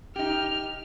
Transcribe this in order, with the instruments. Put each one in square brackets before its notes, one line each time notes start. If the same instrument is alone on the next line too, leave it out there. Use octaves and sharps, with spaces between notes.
[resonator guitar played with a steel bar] D#4 G4 [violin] F6